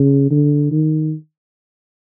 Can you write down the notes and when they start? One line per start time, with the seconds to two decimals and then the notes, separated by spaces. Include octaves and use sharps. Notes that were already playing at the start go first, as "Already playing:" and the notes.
Already playing: C#3
0.31 D3
0.72 D#3